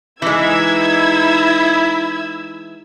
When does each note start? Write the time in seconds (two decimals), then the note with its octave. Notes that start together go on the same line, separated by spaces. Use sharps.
0.22 E3 G#3 D#4 E4 E6 G#6